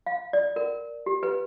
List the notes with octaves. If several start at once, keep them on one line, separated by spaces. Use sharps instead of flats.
F5
D5
A#4
G4
B4